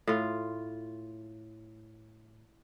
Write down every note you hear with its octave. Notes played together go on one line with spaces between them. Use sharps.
A2 F4